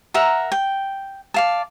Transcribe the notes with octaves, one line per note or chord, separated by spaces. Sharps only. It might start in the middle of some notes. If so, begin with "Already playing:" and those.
A#4 E5 F#5 A#5
G5
D5 F5 A5